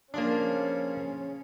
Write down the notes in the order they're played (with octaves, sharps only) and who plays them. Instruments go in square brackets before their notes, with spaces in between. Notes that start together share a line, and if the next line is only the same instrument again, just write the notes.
[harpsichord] C#3 F3 F4 [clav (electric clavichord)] A#3 D4 [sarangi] C#4